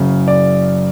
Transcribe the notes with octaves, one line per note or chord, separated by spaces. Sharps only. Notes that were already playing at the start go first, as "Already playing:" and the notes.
Already playing: F#1 F#2 C#3
D5